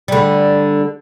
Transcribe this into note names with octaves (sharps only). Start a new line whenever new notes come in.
D3 G3